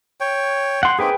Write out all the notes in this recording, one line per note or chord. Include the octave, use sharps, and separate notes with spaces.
C#5 G5
F#5 G5 C6
A#3 C4 D#4 G#4 B4 G5